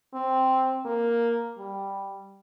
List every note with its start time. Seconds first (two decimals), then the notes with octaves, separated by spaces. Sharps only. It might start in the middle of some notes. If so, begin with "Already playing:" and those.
0.13 C4
0.85 A#3
1.58 G3